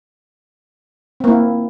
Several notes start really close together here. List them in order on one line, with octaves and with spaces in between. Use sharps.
C4 A#3 E4